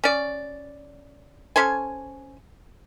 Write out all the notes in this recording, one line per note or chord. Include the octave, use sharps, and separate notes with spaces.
C#4 D5
C#4 A4 C5 G#5